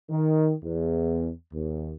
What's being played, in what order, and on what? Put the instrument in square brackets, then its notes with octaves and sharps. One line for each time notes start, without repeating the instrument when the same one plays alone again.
[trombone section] D#3
E2
D#2